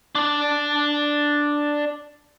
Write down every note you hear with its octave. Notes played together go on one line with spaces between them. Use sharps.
D4 D5